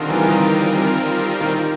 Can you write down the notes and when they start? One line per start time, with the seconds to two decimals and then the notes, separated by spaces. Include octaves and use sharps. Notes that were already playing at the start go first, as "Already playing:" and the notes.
Already playing: D3 D#3 G3 C4 F4 A#4
0.10 E3
0.28 D#3
1.41 D#3